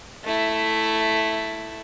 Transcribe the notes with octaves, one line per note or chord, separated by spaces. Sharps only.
A3 E4